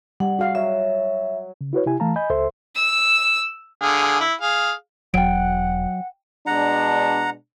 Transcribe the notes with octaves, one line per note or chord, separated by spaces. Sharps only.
G3 F#5
F#4 G#4 F5
F#3 E5 F5
C#3
E4 F#4 B4 C#5
C3 E4 G4 G#5
E3 A3 F5 A5 A#5
D#5 G#5 B5 G6
C#2 A4 C5 E5 C6
E6
D3 G#4 F5
E4
G#4 F5
E1 F#3 F#5 G5 D7
B2 G#3 D4 F#5 A#5